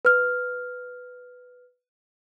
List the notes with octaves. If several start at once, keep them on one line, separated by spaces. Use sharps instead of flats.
B4 F6